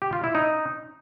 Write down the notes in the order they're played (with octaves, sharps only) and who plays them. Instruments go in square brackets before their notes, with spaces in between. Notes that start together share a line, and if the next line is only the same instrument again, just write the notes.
[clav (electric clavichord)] G4
F4
E4
D#4